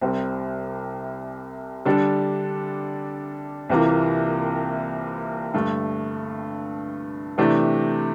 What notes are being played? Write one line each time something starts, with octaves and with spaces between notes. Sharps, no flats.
C2 C3 G3 C4
D3 G3 D4 A4
C2 C3 E3 A#3 F4
G2 D3 A3
C3 E3 A3 D4 G4